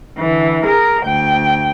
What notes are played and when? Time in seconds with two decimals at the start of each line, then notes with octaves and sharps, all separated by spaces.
0.18 D3 E3
0.64 G#4 A#4
1.04 D2 G5